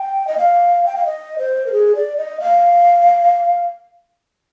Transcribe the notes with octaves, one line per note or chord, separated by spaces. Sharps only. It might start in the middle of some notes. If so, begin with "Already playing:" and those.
Already playing: G5
D#5
F5
G5
F5
D#5
C5
A#4
G#4
D5
D#5
F5